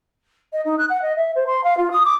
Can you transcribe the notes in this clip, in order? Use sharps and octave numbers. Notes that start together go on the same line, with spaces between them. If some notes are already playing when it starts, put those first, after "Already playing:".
D#5
D#4
F#6
F#5
D#5
E5
C5
C6
F5
F4
D#6
D6